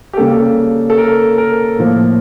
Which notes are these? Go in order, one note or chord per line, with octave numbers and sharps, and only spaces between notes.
G4
C#3 G3 A#3 A4
A4
A#4
A#4
A2 F3 A#3